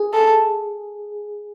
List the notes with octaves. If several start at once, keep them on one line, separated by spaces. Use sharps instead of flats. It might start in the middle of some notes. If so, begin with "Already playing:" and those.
Already playing: G#4
A4